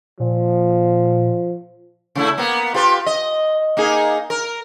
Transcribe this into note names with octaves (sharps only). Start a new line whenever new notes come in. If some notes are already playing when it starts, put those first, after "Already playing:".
A#2 F3
C#3 A3 E4
A#3 B3
F4 G4 B4
D#5
A#3 D#4 G#4
A#4